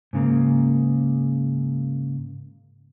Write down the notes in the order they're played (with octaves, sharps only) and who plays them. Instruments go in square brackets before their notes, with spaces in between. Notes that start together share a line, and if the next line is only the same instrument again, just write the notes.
[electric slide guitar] G#2 C#3 A#3